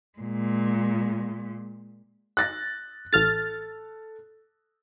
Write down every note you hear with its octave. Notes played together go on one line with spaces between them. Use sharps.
A#2 G#3
F#6 A6 A#6
A1 A4 F6 A6